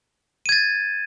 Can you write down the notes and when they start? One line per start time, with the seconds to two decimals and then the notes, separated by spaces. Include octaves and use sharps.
0.46 D#7
0.49 G#6
0.52 A6